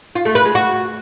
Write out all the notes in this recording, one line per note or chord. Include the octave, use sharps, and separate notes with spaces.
F4
A3
B4
G#3
F#4